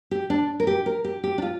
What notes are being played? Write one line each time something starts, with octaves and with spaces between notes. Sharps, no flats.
G4
D4
A#4
G4
A#4
G4
G4
D4
F4